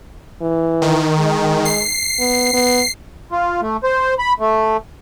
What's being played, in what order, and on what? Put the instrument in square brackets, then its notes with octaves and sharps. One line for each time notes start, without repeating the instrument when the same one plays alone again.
[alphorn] E3
[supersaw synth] D#3
[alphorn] G#3
[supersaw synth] C7
[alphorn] B3
B3
[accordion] F4
A3
C5
B5
A3